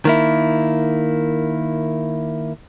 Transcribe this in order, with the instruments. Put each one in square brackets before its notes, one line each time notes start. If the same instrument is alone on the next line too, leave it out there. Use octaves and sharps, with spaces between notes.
[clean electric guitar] D#3 A#3 E4